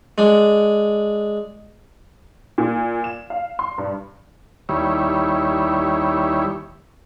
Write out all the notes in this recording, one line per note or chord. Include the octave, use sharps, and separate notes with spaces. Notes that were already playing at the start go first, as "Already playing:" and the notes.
G#3 D4
A#2
E7
F5
C6
G2
D#2 G3 E4 C#5